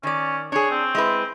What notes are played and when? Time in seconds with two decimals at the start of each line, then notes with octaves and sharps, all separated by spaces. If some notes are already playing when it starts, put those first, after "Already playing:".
0.03 D#3 C#4 D5
0.52 D4 G#4 C#5
0.71 C4
0.95 G#3 E4 B4